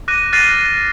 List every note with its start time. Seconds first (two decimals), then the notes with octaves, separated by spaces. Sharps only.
0.08 D6 F#6 A#6 D#7
0.32 F6 F#6 A6 A#6 C7 D#7